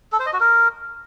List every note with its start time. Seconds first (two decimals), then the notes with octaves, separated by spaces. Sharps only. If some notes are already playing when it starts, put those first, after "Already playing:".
0.12 A4
0.19 C5
0.26 D#5
0.33 F#4
0.40 A#4